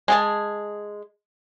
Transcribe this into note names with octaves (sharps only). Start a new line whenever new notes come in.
G#3 G#4 A5